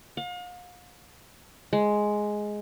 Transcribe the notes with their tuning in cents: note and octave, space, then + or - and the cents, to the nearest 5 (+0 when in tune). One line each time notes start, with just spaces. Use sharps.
F5 +40
G#3 +5